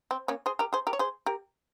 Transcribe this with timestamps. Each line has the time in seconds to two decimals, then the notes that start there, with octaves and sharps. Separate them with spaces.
0.11 C4
0.28 A#3 C#4
0.46 G#4 C5
0.59 G4 A#4
0.73 G#4 C5
0.87 G4 A#4
0.93 C#5
0.99 G#4 C5
1.26 G4 A#4